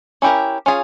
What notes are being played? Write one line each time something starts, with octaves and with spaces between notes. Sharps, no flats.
C#4 E4 G4 A#4
C#4 F4 G#4